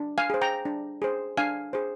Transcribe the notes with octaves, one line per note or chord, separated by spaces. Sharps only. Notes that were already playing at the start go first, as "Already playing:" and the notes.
Already playing: D4
F5 G#5
G#4 C5
G5 A#5
D4
G#4 C5
D4 F5 G#5
G#4 C5